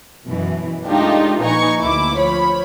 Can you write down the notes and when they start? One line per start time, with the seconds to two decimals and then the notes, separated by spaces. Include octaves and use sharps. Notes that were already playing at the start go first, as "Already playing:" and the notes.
0.27 F#2 B2 E3
0.86 G#3 A3 D4 D#4 F4 G4
1.40 A#1 D#4 B4 G#5 A#5 C#6
1.80 D2 A#3 E4 D6
2.16 F3 C#5 B5